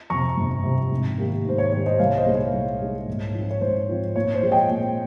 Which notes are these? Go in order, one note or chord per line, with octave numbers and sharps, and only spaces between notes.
F2 C3 A#5 C#6
G1
F2 C3
G#2
D#3 G3 A#3
G#2 C5
C#5
D#3 G3 A#3 C#5
C5 D#5
C2 C#5 F5
C5 D#5
A#2 G#3 D#4
C#5
C2
A#2 G#3 D#4
G#2
F3 C4 F4
C#5
G#2 C5
F3 C4 F4
A#2 C#5
C5
F3 G#3 C4
D#5 G5
A#2